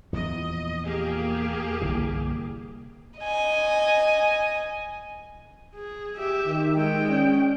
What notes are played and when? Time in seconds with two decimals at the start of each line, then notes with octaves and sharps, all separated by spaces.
0.13 E2 A#2 F3 D#5
0.85 A#3 G4 G#4
1.81 G1 C2 E3
3.20 D#5 G#5
5.75 G#4
6.16 G4 E5
6.46 D#3
6.75 G#3 G5
7.08 C#4 D5